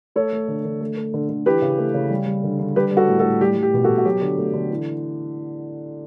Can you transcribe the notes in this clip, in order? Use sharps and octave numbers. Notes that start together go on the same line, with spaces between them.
A3 A4 C#5
A3
D3
D3
A3
A3
D3
D3
E3 G4 B4
C#3
A3
C#3
G3
G3
D3
D3
G3 G4 B4
G3
F#4 A4
A2
F#4 A4
A2
G3 G4
G3
G4
B2
F#4 A4
B2
F#4
F#3 G4
D3
A3
D3
E3